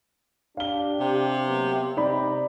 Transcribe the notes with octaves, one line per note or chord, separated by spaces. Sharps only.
D4 G4 F5 G7
C3
F#3 A#3 B3
C3 D#4 D5 B5